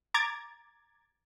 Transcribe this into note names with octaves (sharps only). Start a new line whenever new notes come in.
A#5 D6 G#6 A6